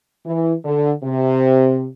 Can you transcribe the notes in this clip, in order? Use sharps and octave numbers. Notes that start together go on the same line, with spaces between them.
E3
D3
C3